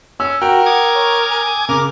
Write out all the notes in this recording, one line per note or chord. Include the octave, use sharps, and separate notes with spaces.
C#4 E6
F#4 A#4 F#5 G5
D6 D#6 G#6
C#5
G#5
C#3 A#4 D6